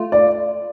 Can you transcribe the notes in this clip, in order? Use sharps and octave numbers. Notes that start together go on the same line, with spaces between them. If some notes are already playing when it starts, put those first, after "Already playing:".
Already playing: A3 F4
D5